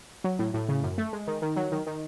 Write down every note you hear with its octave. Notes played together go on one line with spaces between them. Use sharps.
F#3
A2
A2
C#3
F#2
A3
G#3
D#3
D#3
F#3
D#3
D#3